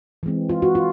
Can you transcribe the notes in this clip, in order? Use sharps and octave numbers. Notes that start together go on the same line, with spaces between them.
E3 G#3 C4
F4
F#4
F4